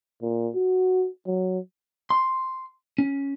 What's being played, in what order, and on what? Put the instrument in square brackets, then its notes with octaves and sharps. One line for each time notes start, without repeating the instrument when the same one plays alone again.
[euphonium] A#2
F#4
F#3
[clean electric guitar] C6
C#4